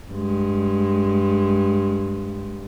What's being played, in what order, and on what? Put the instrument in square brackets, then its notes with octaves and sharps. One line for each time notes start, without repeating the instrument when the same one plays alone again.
[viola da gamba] G2 G#3